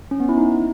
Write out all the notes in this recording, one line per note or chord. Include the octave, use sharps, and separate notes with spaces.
C#4
B3
E4
D#4